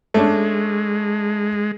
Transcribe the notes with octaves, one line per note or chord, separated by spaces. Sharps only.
G#3 A3 C#4 D4